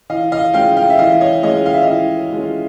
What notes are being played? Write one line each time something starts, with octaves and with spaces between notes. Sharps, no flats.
E3 D#5 F5
D#5 F5
G#3 C#4 F4 F5 G5
F5 G5
E5
E3 D#5 F5
C#5 D#5
G#3 C#4 F4 C#5 D#5
F5
E5
D#5 F5
E3
G#3 C#4 F4